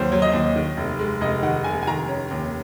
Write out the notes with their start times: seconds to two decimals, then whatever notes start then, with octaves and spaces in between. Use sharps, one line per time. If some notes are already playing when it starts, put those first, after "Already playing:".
Already playing: D#2 F#3 C5
0.12 F#3
0.22 D#5
0.33 D#2
0.56 D#3
0.77 F1
0.99 G#3
1.21 F1 D#5
1.43 D#3 F#5
1.64 F1 G#5
1.83 G#5
1.87 D#3 A#5
2.09 C#4
2.31 D#2